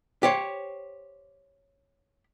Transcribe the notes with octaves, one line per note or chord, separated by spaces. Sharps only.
G4 C5 C#5